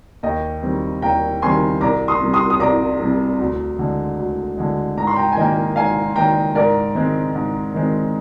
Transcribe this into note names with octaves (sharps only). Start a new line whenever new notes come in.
D#2 D#5 G5
D#3 G3 C4
D#2 G5 A#5
D#3 G3 C4 G#5 C6
C2 A#5 D6
C6 D#6
C3 G3
C6 D#6
D#6
C2 A#5 D6
C3 G3
D2
D3 G#3
D2
D3 G#3
G#2 A#5
C6
G5 A#5
G#5
D#3 A#3 D#5 G5
G#2 F5 G#5
D#3 A#3 G5 A#5
G#2 A#4 D5
D#3 G#3 C4
G#2
D#3 G#3 C4